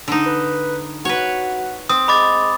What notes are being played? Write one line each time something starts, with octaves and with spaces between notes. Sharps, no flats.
D3 D#4
B4
F#4 B4 C#5
C4 D#6
G#3 B5 D6 A6